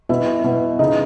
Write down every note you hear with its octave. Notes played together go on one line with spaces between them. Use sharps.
B2 E4 E5
B2
C#3 D#4 D#5